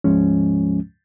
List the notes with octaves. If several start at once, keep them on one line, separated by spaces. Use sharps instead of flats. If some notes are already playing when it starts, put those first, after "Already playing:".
D2 G#2 F3 G#3 C#4